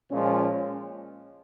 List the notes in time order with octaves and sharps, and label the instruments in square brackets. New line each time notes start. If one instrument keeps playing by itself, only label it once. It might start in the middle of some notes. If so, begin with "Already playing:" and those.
[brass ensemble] A#2 F3 G#3 C#4